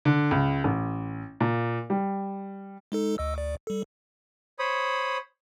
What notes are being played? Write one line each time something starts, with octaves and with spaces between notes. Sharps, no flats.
D3
C#2
A1
A#2
G3
G#3 D#4 A4
D2 D#5 E6
D2 D5
G3 A4
C5 C#5 B5 D#6